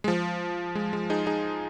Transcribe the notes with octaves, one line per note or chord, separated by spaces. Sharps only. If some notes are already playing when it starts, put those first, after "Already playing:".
G#3
F3
G#3
G#3
D#4 G#4
D#4 G#4